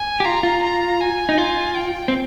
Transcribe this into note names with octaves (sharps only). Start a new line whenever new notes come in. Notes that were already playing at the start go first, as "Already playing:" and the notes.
Already playing: G#5
G4
F4 A#5
F4
A#5
G#5
D#4
F4
G5
C4